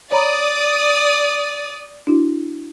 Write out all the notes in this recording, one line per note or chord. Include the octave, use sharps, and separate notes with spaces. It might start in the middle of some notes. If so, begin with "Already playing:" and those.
C#5 D5 A#5 B5 D#6
D4 E4 F#4